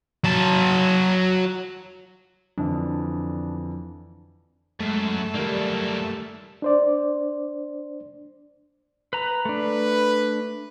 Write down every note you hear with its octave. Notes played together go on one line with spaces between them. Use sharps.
F#3 A5
F2 D3 E3 D4
F#2 G#3 A3
F#2 D#3 G3 A#3 D5
D4 C5 D5
B4 A#5
A3 D4 B4